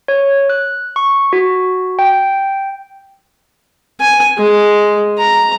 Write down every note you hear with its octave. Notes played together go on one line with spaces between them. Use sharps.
C#5
F#6
C#6
F#4
G5
G#5
G#3
A#5